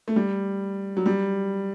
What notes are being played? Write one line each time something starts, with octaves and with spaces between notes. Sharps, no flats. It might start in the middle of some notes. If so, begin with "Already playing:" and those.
A3
G3
F#3
G3